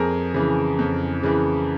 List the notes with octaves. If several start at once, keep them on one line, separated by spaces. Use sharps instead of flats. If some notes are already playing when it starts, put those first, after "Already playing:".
Already playing: F2 G#4 A#4
C#3 E3
F2
C#3 E3